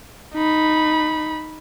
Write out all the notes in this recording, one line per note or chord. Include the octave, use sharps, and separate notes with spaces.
D#4 B5